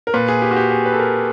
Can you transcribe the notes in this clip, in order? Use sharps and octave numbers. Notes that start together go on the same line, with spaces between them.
A#4
A#2 B4
G#4
G4
F#4
G4
G#4
B4
A4
A#4